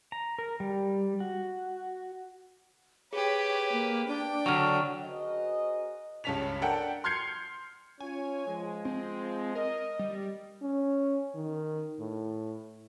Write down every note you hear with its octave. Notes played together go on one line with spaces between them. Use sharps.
A#5
A#4
G3
F#4
G4 G#4 B4 C#5
A#3
D4 G5
D3 F#3 C#6 F6
C#4 F#4 G#4 A#4 C5 D#5
C#2 G2 C#4 A5 B6 F7
D4 A4 A#4 F#5 G5
C6 F6 G6 G#6 C7 C#7
C#4 F4 C#5 G#5
F3 G#3
C4
A#4 D#5
G3
C#4
D#3
A2